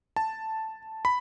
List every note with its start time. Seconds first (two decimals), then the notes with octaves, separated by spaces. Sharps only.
0.16 A5
1.05 B5